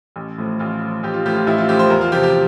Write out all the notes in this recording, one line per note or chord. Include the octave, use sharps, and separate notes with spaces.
A1
A2 F3
A1 F4
A2 F3
A1 G4
F4
A2 F3 G4
F4
A1 E4
F4
A2 F3 G4
C5
E2 A#4
F4
C3 F3 G4
G4